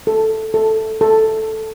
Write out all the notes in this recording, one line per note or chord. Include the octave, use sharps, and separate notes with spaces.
A4
A4
A4